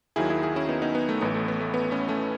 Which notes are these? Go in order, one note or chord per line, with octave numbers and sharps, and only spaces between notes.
D#2 D#3 F#3 E4 G#4
E4 G#4
E4 G#4
C#4 E4
B3 D#4
B3 D#4
B3
A3
A1 A2 E3 B3
A3
B3
A3
B3
A3 C#4
A3 C#4